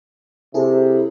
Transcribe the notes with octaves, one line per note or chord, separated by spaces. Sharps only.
C3 E4 G#4 A4